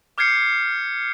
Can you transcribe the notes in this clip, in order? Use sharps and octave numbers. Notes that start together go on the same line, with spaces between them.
D6 F6 G6 G#6 C7 C#7